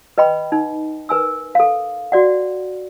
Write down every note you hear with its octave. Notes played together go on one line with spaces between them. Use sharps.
B4 D#5 G5 B5
D#4
A#4 B4 G#5 E6
A4 F5
F#4 D5 F#5